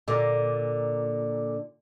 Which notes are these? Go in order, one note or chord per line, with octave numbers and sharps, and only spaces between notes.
A#2 D3